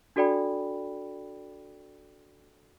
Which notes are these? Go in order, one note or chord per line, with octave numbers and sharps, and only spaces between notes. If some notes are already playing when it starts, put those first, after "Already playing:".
D4 F#4 A4 D5 G5 B5